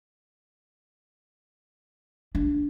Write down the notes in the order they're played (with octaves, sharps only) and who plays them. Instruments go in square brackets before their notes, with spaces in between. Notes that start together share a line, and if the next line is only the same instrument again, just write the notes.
[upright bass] D4